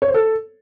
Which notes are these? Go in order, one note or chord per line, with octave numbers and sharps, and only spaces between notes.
C#5
C5
A4